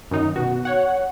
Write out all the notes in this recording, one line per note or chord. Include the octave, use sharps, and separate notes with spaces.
F#2 D#3 D#4
B2 F#4
C#5 F#5